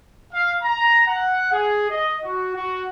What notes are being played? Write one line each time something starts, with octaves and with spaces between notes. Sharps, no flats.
F5
A#5
F#5
G#4
D#5
F#4
F#4